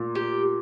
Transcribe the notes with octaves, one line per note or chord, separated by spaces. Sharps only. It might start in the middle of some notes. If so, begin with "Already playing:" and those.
Already playing: A#2
G4